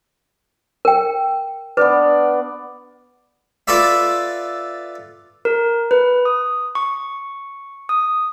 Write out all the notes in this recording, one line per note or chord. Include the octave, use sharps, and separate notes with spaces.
A#4 G5
B3 D4 B4 D5
F4 A4 B4 D5 E5
A#4
B4
D#6
C#6
D#6